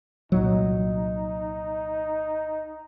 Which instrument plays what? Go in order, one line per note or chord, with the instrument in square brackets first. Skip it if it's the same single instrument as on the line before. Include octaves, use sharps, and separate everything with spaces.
[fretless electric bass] C2 A#2 F#3 [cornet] D#4